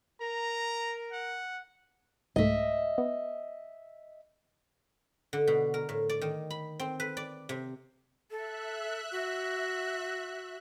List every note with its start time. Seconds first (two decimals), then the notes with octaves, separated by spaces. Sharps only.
0.21 A#4 A#5
1.12 F#5
2.36 C2 G#2 A3 D#5 E5
2.98 B3
5.33 D3
5.47 B2
5.74 A#4
5.89 A2
6.09 D5
6.21 D#3
6.50 B5
6.80 C4
7.00 B4
7.17 D5
7.49 C3
8.31 A4 E5 F#6
9.11 F#4